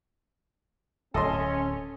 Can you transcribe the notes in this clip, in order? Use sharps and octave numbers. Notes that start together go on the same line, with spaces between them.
D1 C#4 A4 D#5 C6